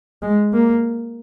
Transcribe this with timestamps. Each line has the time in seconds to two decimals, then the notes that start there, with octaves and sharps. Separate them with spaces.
0.22 G#3
0.53 A#3